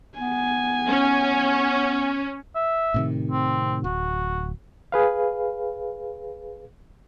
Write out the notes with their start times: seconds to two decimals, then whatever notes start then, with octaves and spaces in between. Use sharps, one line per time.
0.18 B3 G#5
0.88 C#4
2.55 E5
2.94 A2 C3 D#3
3.31 C4
3.84 D1 F#4
4.92 G#4 B4 F5